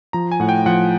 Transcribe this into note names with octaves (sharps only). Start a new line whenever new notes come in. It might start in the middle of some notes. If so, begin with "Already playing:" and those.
F3 A#5
G#5
A2 F#5
G5
F3 F#5